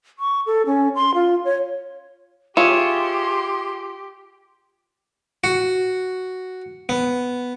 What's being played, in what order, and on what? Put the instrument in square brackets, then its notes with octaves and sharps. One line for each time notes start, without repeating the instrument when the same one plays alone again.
[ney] C#6
A4
C#4
C6
F4
C#5
[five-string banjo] F4 [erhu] G4 [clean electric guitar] G#4 C#5 E5 [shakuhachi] C6
[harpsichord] F#4
B3